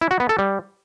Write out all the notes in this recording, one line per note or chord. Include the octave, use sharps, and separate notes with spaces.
E4
F#4
B3
A4
G3